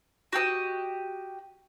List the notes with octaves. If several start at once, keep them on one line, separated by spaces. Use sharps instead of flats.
F#4 G4 A4 D#5